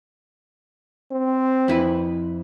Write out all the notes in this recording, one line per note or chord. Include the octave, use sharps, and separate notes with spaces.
C4
F2 E4 B4